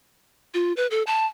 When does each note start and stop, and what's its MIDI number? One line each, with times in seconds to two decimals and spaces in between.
0.54 0.73 65
0.77 0.87 71
0.91 1.03 69
1.07 1.26 81